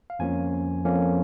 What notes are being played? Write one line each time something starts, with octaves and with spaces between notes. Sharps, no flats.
F5
F2 F3 A#3 C#4 G#5
F2 F3 A#3 C#4